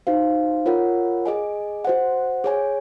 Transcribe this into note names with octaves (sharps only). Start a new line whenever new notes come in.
D#4 F#4 C5 F5
F4 A#4 C#5 F#5
G#4 D#5 G#5
F#4 C5 F#5
G#4 C#5 G#5